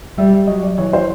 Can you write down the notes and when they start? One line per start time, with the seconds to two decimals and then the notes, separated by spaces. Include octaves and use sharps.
0.18 G3 E5
0.33 E5
0.47 F#3 D#5
0.63 D5
0.78 E3 C#5
0.93 C5